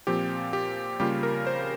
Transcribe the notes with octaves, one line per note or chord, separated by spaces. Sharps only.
A#2 F3 C4 G4
G4
C#3 G3 A#3 F4 G4
A#4
C5